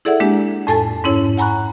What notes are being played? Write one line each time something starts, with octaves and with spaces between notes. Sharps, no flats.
E4 G#4 A4 D5 E5 F#5
G#3 A#3 D4 G4
F2 A2 A4 G#5 A5 A6
G#2 C#4 E4 C#5
F#5 G#5 A#5 B5 C#6 F#6